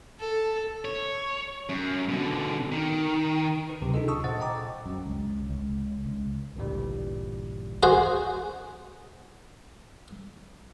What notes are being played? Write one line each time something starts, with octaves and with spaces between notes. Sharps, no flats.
A4
C#5
F#2
B2 D3
D#3
B4
D2 C3 F#3
D4 D#4 F4 G#4 A4 D#5
A5 C#6 D#6 E6
A#2 C5 D#5 F#5 A6
D#5 G5 A#5 D6
F#2
C#2
C#2
C#2
A1 D2 G2 A#2 E3 G3
F#4 G#4 C5